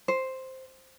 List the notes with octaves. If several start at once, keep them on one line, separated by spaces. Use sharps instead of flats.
C5